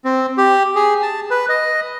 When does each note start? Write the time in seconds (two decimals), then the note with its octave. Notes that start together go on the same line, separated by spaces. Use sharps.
0.04 C4
0.38 G4
0.76 G#4
1.03 A5
1.31 B4
1.49 D#5